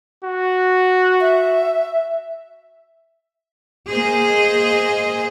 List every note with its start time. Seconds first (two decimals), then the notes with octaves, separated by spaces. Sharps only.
0.24 F#4
1.21 E5
3.89 A#3 G#4 C5 D#5